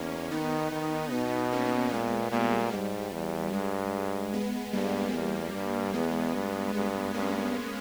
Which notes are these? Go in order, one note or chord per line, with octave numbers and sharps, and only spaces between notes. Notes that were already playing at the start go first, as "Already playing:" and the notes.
Already playing: E2 A#3 C#4
D#3 B3 D#4
D#3
B2 B3 D#4
A#3 C#4
A#2 G#3 B3
A#2 G3 A#3
G#2 G3
E2
G2 G#3
G#3 B3
G2 G3 A#3
E2
G2
E2 G#3 B3
G2
G2 G#3 B3
G2 A#3 C#4